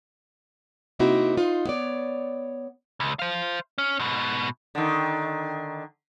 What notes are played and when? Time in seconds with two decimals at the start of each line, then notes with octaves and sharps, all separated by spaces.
0.99 C3 A#3 C4 D#4 E4 F#4
1.37 D#4 F4 C5
1.66 B3 C#5 D5
3.00 C#2
3.19 C5 F5
3.78 C#4
3.99 G#2 B2
4.75 D3 D#3